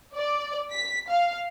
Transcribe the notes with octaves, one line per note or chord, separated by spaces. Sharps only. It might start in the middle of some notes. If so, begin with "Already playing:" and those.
D5
B6
F5